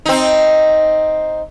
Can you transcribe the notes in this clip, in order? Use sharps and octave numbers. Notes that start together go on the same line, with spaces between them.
C4 D#4